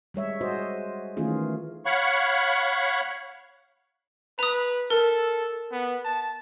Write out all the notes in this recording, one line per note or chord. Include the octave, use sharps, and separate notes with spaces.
G3 G#3 C#5 E5
F#4 G#4 C5 D#5
D#3 E3 A3 C#4 F4 G#4
C#5 F5 F#5 B5 C#6
B4 A#5 D#6
A4 A#4
B3
A5